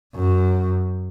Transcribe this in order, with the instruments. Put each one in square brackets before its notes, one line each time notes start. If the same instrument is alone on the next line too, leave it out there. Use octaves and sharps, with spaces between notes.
[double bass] F#2